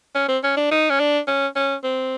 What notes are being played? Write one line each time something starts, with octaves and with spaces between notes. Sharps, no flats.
C#4
C4
C#4
D4
D#4
C#4
D4
C#4
C#4
C4